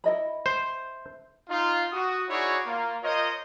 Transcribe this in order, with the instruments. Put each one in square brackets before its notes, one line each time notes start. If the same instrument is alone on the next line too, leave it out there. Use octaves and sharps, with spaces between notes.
[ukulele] E4 D#5 B5
[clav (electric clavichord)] C5
[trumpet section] D#4 F4
F#4 D#6
D#4 E4 F#4 G#4 C#5 D5
A#3 F4
F4 A#4 C5 C#5 D#5